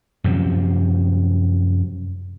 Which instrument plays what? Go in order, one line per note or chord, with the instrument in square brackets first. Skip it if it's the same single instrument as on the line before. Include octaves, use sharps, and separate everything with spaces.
[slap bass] F#2 C3 F3